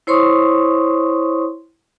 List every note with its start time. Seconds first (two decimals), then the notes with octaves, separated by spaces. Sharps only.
0.07 E4 C5 C#5 C6 C#6 D#6